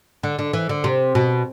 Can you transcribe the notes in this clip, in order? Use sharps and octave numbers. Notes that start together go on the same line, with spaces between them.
D3
D3
E3
D3
C3
B2